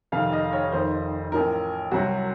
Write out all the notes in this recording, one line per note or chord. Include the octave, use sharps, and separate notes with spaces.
F1 F2 C3 D#3 F5
D#5
C#5
F1 F2 D#3 C5
A1 A2 F3 A#4
C2 C3 F#3 F#4